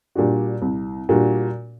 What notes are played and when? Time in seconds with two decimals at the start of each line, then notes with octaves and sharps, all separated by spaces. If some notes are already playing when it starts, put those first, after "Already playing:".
0.15 A#2 G3 D4 F#4
0.62 C2
1.09 A#2 G3 D4 F#4